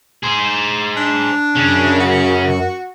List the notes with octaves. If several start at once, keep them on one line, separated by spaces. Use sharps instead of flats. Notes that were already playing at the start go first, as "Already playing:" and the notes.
G#4 C5
D4
F#2 C#3 C#4
F#4